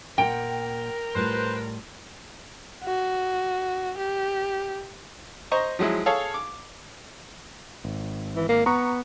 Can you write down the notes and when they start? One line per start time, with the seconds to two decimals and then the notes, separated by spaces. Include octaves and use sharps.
0.18 A#2 A#4 F#5 G5
1.15 A2 G3 F4 B4 C5
2.83 F#4
3.98 G4
5.52 C5 D#5 A#5 C#6
5.79 F3 F#3 G#3 E4
6.06 G#4 A4 C#5 F5 A5
6.34 D6
7.84 G#1
8.36 E3
8.49 A#3
8.66 B3 A#5 C#6